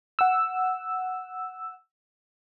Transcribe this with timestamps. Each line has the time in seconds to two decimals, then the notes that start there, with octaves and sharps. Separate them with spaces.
0.19 F#5 E6